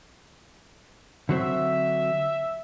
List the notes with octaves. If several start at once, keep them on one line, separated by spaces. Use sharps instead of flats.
D3 F#3 C4 E5